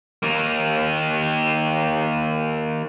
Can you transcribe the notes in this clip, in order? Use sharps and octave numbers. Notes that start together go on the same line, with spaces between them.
D#3 A#3